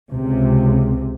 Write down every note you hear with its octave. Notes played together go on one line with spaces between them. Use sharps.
C#2 C3